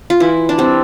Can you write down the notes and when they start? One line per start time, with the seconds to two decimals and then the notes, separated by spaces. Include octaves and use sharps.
0.10 F4
0.20 E3 E4
0.49 D4
0.58 G3 C4